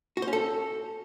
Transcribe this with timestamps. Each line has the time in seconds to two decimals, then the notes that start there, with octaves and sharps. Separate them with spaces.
0.17 F#4
0.22 C5
0.28 C#4
0.33 A4